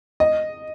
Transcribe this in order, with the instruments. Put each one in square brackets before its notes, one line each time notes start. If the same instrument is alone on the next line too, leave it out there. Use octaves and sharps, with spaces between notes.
[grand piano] D#5